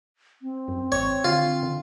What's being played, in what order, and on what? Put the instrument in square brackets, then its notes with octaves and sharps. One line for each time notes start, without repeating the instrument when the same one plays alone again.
[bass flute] C4
[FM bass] F#2
[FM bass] G#1 [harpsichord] C#5
[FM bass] D3 [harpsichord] F4
[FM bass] D3